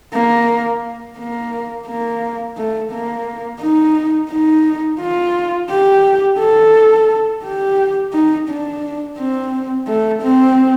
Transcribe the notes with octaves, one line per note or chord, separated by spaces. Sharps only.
A#3
A#3
A#3
A3
A#3
D#4
D#4
F4
G4
A4
G4
D#4
D4
C4
A3
C4